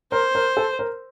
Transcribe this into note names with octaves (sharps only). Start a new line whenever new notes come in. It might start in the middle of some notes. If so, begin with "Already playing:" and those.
A#4 C5
A#4
A4
A#4